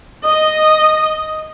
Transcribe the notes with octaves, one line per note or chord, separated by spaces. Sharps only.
D#5